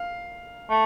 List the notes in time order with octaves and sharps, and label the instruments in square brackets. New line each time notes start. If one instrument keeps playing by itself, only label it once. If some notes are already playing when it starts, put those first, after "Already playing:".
Already playing: [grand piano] F5
[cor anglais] A3